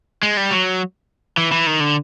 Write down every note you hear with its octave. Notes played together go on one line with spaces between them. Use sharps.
G#3
G3
F#3
E3
E3
D#3
D3